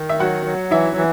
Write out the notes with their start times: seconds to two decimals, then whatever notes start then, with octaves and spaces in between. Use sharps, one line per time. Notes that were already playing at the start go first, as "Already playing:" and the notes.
Already playing: D#3
0.09 E5
0.20 F#3 F#4 F#5
0.46 F#3
0.71 E3 E4 E5
0.97 E3